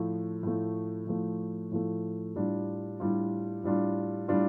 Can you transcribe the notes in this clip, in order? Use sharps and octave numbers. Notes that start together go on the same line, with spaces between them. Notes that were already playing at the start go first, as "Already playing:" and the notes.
Already playing: A2 F3 A3
A2 F3 A3
A2 F3 A3
A2 F3 A3
A2 G3 D4 F4
A2 G3 D4 F4
A2 G3 D4 F4
A2 G3 D4 F4